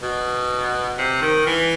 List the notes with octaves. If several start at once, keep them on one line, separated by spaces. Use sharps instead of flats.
B2
C3
D#3
E3